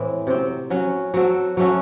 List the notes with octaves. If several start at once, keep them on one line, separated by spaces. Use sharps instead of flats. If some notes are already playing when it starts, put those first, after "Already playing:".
Already playing: A2 E3 G#3 C4
C3 F#3 C4
F#3 C#4 F#4
F#3 C4 F#4 A4
F#3 A3 C#4 F#4